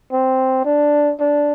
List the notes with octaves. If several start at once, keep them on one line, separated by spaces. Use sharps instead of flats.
C4
D4
D4